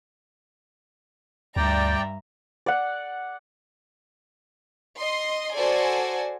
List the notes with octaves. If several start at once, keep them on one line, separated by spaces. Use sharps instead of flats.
D2 G2 D5 E5 G5 A#5
D5 F#5
D#5 C6
F#4 A4 C5 D5 G#5